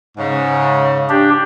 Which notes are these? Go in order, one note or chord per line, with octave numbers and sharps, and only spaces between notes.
G#2 C#3
D4 G4